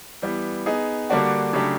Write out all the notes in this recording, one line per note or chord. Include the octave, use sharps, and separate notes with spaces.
E3 G3 B3
B3 D#4 G#4
D3 G3 A#3 D4 F#4
C#3 F#3 A3 D4 G4